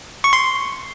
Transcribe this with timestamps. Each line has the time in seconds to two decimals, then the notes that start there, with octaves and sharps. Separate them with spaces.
0.24 C#6
0.33 C6